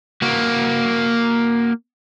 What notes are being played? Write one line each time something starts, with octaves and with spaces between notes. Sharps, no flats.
A#3 F#4